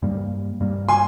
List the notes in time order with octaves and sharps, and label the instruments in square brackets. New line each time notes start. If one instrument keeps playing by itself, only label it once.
[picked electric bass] G2 G3 A#3
G2 G3 A#3
[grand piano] G#5 C6